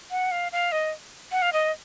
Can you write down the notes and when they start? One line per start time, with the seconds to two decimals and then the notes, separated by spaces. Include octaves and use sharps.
0.11 F#5
0.31 F5
0.52 F5
0.72 D#5
1.32 F#5
1.42 F5
1.53 D#5